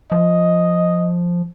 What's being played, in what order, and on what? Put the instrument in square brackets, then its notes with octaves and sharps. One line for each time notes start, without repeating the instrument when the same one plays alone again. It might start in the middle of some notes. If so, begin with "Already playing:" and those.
[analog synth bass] F3 [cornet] D#5